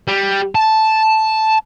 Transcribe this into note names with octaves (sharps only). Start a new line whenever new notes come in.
G3
A5